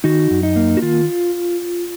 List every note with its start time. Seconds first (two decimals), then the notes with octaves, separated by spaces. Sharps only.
0.04 D#3 D#4 F#4
0.31 F#2
0.43 D#4
0.56 A#3
0.77 F#4
0.82 D#3 F4